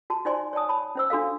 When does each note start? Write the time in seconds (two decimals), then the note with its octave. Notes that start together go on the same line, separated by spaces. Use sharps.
0.10 F#4 A5
0.25 D#4 F#4 C5 D5 G#5 C6
0.53 C#5 D5 G#5 A5 D#6
0.69 C#5 A5 B5
0.95 C#4 C5 E6
1.10 D4 F#4 A4 F5